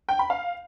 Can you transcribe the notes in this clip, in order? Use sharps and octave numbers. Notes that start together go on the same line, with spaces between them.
G5
B5
F5